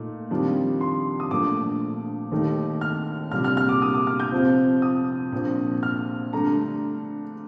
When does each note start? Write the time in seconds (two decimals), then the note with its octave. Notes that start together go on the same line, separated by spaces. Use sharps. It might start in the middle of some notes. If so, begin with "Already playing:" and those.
Already playing: A#2 A3 D#4
0.30 F2 D#3 G3 D4 F4
0.81 C6
1.20 D#6
1.31 A#1 A#2 A3 D4 D6
2.32 D#2 D#3 A3 D#4
2.81 F6
3.31 C2 A#2 G3 D4 F6
3.44 F6
3.57 F6
3.69 D6
3.82 D#6
3.94 D6
4.07 F6
4.20 G6
4.32 F2 C3 F3 C4 F4
4.82 D#6
5.32 A#1 A#2 F3 C4
5.83 F6
6.33 G2 D3 A3 D4 A#5